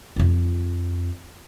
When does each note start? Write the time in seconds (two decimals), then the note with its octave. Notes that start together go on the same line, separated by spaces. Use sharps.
0.16 F2 F4